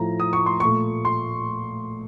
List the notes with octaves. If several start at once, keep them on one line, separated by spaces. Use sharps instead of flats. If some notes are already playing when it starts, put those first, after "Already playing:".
Already playing: A2 F3 A3 A#5
D#6
C#6
C6
A#2 A3 C#6
C6